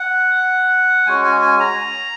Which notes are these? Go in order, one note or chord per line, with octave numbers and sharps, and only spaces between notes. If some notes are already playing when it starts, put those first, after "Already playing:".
Already playing: F#5
G#3 C#4 F#4 G#5
G#5
G#5
A#5